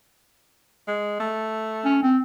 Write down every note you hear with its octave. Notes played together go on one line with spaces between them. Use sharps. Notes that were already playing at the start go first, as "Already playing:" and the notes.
G#3
A3
C#4
C4